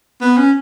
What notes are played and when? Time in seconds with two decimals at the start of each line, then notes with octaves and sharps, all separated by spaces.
0.21 B3
0.38 C#4